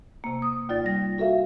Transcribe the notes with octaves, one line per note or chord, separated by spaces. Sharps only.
C3 A#3
D#6
D#2 F4 D5 A6
G3 A#6
F#4 A4 A#4 E5 F5